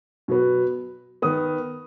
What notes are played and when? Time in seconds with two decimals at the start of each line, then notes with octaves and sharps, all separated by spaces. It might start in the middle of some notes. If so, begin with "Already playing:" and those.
0.28 B2 F#3 B3
1.22 D#3 B3 D#6